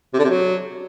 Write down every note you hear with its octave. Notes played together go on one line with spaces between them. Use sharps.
C3
D3
C3
F#3